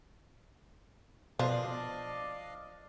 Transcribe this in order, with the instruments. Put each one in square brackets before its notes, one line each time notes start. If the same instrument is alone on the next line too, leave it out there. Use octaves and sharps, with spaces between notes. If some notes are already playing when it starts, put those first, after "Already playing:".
[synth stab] B2 [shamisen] F3 [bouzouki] D4 [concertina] D5 D#5 F5